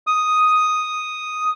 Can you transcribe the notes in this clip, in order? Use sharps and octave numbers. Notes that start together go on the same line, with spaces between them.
D#6